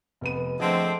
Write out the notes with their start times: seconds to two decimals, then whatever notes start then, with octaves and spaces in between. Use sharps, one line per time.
0.21 F1 B3 D#7
0.60 D3 F3 A3 C4 G#4 D#5